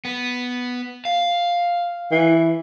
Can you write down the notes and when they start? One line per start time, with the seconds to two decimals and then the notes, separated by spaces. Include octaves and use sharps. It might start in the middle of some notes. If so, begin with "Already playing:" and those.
0.05 B3
1.05 F5
2.12 E3